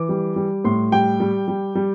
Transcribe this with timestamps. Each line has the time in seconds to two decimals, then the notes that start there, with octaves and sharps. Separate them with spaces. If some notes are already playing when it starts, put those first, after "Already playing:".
Already playing: E3 D6
0.09 G3
0.36 G3
0.65 A2 C6
0.92 G3 G5
1.20 G3
1.48 G3
1.75 G3